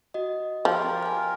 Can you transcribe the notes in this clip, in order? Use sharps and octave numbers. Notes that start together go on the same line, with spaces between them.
F#4 D#5
F3 F4 G4 A#4
G#5 F6